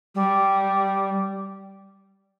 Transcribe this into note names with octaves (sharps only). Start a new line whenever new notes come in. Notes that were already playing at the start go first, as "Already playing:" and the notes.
G3